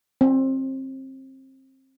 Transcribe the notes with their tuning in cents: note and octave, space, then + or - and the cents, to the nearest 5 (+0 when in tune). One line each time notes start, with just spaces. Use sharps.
C4 +25